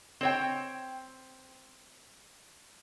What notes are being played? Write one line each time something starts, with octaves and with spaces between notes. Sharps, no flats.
C4 C#5 G5